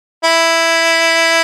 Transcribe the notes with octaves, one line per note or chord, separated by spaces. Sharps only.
E4